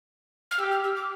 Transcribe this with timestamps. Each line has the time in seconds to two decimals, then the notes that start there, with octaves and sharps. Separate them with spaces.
0.51 F6
0.58 G4 E6
0.71 F6
0.84 E6
0.96 D6